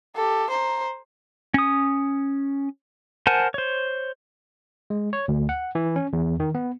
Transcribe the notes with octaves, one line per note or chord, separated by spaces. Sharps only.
G4 A4
C5 A#5
C#4 D#6
A#4 C5 F#5 G#5 A5
C5 C#5
G#3
C#5
D2
F#5
E3
C#4
E2
D#3
B3